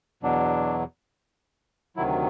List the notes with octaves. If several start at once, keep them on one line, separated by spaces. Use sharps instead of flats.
E2 B2 F#3 D4
D2 C3 D#3 F#3 E4